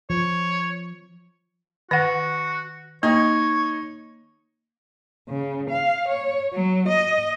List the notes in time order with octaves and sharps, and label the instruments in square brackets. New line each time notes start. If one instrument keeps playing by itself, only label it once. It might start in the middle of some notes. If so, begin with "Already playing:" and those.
[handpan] F3 [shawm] C#5
[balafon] D#3 F#5 [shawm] F#4 [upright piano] A#6
[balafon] A#3 [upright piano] D#4 [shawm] C#5
[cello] C#3
F5
C#5
F#3
D#5